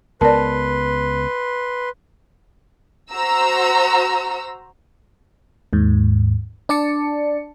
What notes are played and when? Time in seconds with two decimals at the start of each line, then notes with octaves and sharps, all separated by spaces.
0.21 C#2 B3 A#4 B4 D5 A5 C6
3.12 F#4 C5 A#5 E6
5.73 D#2 G#2
6.69 D4 D5 A5 C#7